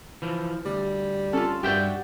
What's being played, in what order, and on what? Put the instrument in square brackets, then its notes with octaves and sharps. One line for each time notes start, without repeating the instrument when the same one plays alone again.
[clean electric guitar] E3 F3
[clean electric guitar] D2 [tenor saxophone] G3
[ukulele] C#4 F4 [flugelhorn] A4
[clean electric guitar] G2 E5 G5 [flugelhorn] F#4 [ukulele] G4 D5